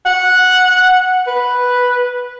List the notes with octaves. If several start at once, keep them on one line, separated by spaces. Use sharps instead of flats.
F#5
B4